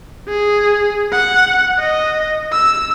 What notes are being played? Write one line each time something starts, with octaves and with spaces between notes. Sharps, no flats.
G#4
F#5
D#5
E6